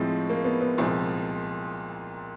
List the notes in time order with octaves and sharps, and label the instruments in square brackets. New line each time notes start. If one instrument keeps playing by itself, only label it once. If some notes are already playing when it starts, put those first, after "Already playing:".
Already playing: [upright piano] A2 F3 G#3 C4
A#3
B3
B3
C2 A#2 F3 G#3 C4